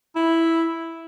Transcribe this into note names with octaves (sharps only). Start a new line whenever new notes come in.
E4